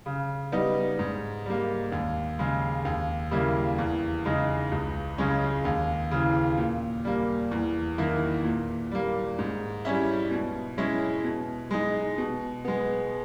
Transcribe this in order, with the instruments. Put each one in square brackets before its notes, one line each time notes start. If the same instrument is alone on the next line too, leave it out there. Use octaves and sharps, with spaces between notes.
[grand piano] C#3
G3 B3 D#4
G#2
G3 A#3
D#2
C#3 G#3
D#2
C#3 G3 A#3 E4
E2
C#3 G#3 D#4
C#2
C#3 G#3 C#4
D#2
C#3 E3
A#2
G3 A#3
E2
D#3 A#3 E4
A#2
G3 A#3
G#2
G3 C#4 E4
B2
G#3 C#4 E4
B2
G#3 D#4
B2
G#3 B3